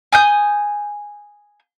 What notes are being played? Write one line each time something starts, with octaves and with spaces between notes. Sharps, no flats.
G#5 D#6 G6